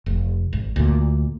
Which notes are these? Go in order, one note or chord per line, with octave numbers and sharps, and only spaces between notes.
F1
G#1
D2 A#2